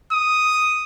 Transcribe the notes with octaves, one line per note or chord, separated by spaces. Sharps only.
D#6